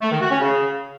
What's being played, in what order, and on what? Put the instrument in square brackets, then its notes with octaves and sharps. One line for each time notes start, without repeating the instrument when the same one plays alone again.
[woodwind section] A3
D#3
F#4
C#4
C#3